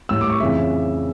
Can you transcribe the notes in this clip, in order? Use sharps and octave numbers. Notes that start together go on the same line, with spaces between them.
A2 G3 A#3 E6
D6
C#6
F2 C#3 E3 E5